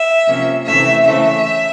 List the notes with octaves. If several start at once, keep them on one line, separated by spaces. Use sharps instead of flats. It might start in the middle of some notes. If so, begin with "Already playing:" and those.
Already playing: E5
C3 F3 A#3 C#4
C3 E3 A3 C#4 E5
C#3 E3 A3 C4 E5